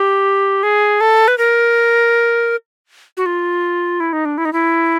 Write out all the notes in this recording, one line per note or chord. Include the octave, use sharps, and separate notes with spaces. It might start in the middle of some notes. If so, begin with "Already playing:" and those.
Already playing: G4
G#4
A4
B4
A#4
F#4
F4
E4
D#4
D4
E4
D#4
E4